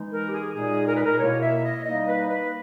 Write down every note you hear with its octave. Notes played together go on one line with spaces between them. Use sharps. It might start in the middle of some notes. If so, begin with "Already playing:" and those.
Already playing: E3 G#3 D#4
A#4
G4
G#4
A#2 G#3 D#4 G#4
A#4
B4
A#4
B2 A#3 E4 C#5
E5
D#5
G3 A#3 D#4 D#5
B4
B4